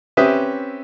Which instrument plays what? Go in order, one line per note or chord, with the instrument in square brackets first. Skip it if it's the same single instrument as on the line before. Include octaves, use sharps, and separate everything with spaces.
[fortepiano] C4 C#4 G4 B4 E5 D#6